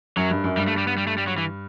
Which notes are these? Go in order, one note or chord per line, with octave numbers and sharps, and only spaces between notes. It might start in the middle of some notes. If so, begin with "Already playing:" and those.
F#2 F#3
G2
F#2
G2 G3
A3
G3
B3
G3
A3
G3
F#3
E3